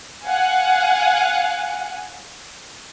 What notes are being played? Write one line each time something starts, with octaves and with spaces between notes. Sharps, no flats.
F5 F#5 G#5